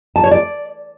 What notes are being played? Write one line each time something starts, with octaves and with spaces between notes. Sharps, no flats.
A5
C#5
D5